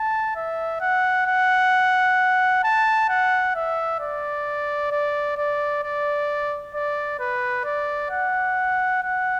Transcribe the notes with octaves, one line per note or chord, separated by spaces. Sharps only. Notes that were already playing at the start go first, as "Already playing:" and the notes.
Already playing: A5
E5
F#5
F#5
A5
F#5
E5
D5
D5
D5
D5
D5
B4
D5
F#5
F#5